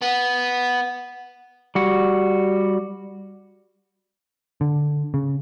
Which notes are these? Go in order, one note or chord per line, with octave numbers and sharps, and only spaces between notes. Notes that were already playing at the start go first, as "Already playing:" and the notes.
B3
G3 F#4
D3
C#3